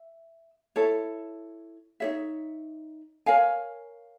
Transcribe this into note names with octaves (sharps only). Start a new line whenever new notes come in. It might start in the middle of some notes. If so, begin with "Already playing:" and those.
Already playing: E5
E4 A4 C#5
D#4 G#4 C#5 E5
A#4 C#5 F5 G#5